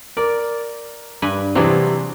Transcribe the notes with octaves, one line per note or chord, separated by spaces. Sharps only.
A#4 D5
G2 B4 G#5
C3 E3 F#3 C4 D4 G#4